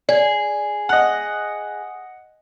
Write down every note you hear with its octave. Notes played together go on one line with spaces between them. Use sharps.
G#4 D5
D#5 F#5